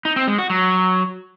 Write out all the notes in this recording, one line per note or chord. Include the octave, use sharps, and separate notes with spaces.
D#4
C4
G#3
F#4
F#3